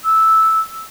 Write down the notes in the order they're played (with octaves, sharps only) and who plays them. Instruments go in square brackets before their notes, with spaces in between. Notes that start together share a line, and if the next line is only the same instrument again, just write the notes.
[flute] E6